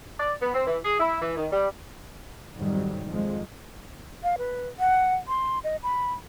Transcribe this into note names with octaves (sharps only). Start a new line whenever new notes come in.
D5
B3
C4
E3
G#4
E4
E3
D#3
G3
G#1 F2 G#2 D#3 F#3 G3
F2 F3 G#3
F5
B4
F#5
C6
D#5
B5